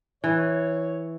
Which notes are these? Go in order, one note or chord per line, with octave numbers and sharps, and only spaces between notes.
E3 C#5